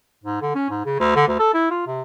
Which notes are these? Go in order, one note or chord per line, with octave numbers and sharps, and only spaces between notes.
G#2
D3
C#4
G#2
C#3
D2
D3
D2
A4
E4
F4
C3